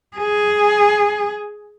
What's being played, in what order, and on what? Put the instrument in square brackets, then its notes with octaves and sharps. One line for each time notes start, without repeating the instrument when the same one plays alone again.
[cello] G#4